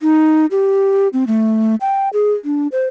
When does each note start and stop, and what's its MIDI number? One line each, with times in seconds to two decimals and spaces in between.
0.01 0.46 63
0.51 1.08 67
1.13 1.24 60
1.27 1.75 57
1.81 2.09 79
2.13 2.33 68
2.45 2.67 62
2.72 2.87 72